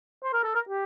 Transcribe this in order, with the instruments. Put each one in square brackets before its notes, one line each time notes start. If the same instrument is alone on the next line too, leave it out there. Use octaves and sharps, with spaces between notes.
[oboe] C5
A#4
A4
A#4
G4